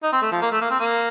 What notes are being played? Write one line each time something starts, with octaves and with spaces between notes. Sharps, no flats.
D#4
C4
A3
F3
A#3
A3
A#3
C4
A#3